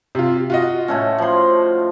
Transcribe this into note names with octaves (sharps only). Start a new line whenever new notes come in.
C3 F4
F4 F#4 D#5
A2 A3 C#4
F3 C6